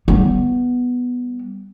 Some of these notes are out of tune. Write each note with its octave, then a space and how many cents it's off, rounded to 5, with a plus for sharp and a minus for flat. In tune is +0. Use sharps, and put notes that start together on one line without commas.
G3 +0 B3 +0